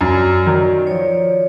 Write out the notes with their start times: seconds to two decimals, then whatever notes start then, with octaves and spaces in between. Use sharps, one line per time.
0.01 F#2 D5
0.46 D#3 F#3 D5
0.87 C#5
0.90 F3 D5